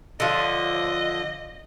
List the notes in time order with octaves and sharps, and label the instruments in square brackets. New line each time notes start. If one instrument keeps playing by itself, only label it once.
[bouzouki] D3 F3 [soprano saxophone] D#5